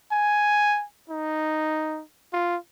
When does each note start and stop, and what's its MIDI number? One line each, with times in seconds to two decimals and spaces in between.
0.12 0.85 80
1.10 2.02 63
2.33 2.57 65